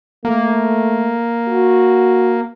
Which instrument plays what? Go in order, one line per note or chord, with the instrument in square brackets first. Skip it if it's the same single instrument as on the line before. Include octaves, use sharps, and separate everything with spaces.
[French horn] A3 [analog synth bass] A#3
[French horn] F#4